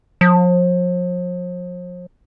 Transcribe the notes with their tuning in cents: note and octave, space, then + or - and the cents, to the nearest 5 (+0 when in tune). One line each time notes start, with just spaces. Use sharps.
F3 +40